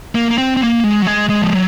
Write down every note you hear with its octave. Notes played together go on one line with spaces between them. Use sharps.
A#3
A#3
C4
C4
A#3
G#3
F#3
G#3
G#3
F3
F#3